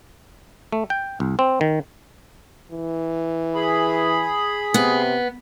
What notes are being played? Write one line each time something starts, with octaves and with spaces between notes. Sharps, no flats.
A3
G5
C2
C4
D#3
E3
G#4 B5
C3 B3